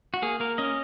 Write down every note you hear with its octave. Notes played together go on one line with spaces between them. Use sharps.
F#4
A#3 G#4
A#3 A#4
C#4 D#5